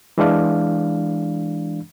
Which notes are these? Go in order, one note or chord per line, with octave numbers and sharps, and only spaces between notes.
E3 G#3 D4 F5